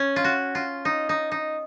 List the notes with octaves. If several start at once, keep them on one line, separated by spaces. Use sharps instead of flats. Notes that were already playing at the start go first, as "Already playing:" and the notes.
Already playing: C#4
F4
F#4
F4
D#4
D#4
D#4